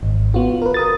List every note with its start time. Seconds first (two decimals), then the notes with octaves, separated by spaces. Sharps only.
0.03 G#1
0.34 B3 F4 F#4
0.62 A#4 B4
0.74 A#4 D#6 A6